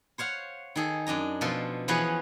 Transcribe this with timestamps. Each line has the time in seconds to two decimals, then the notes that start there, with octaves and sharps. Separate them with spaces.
0.18 C5 C#5 F5 F#5
0.76 D#3 G#4 A4
1.07 F#2 D4 D#5 A#5
1.41 B2 F3 F4 A4 C6
1.88 E3 F3 B3 F#4 G#4 C#5